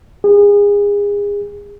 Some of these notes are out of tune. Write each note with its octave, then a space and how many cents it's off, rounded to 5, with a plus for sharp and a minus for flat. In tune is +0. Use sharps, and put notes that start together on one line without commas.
G#4 -30